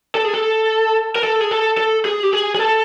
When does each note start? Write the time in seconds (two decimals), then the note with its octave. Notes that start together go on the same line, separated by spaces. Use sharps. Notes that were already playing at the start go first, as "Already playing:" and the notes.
0.15 A4
0.25 G#4
0.34 A4
1.16 A#4
1.24 A4
1.41 G#4
1.51 A4
1.77 A4
2.05 G#4
2.23 G4
2.33 G#4
2.55 G#4
2.59 A4